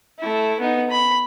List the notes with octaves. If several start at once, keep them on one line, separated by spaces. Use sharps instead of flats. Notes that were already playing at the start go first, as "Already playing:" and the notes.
A3 E4
B3 D#4
B5